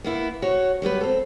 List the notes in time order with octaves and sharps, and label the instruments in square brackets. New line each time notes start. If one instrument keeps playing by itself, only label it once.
[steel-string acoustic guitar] A#3 B3 E4
F#4 C#5
F#3 G3 B3 B4
C4 A4